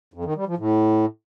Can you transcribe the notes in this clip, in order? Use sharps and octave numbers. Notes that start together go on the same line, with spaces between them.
F2
D#3
G3
F3
A2